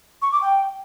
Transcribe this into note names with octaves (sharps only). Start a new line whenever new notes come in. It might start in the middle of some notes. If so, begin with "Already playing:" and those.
C#6
D6
G5